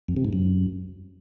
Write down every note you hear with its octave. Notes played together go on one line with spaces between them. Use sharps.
F2
C3
G#2
F#2